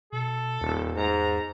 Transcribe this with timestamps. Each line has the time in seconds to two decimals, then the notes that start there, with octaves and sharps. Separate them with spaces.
0.12 B2 A4
0.61 D#1 E2
0.97 G#2 A#5